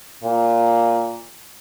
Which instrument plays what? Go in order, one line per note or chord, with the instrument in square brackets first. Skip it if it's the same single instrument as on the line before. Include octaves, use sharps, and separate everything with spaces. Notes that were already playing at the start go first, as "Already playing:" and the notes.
[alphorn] A#2